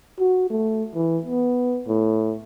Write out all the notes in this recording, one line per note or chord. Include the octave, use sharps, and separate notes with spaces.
F#4
A3
E3
B3
A2